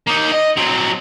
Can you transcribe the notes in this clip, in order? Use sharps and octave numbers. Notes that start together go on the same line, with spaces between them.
A#3 D#4
D#5
F#3 C4